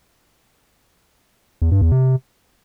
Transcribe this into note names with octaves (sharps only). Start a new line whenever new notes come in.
E2
G2
E2
C3